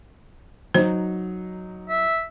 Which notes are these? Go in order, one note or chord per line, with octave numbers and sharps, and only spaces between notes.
F#3 D#4 C5
E5